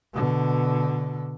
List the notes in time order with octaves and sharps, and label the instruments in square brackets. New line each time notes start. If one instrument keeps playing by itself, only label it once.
[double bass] B2 D3